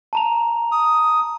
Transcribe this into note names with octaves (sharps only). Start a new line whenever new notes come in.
A5 A#5 F7
D#6